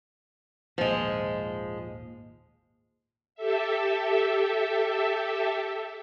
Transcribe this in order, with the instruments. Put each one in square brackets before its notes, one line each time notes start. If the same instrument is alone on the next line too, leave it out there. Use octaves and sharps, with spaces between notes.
[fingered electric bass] G#1 D#2 A#2 [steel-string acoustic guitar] F3 G#3
[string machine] G4 A4 E5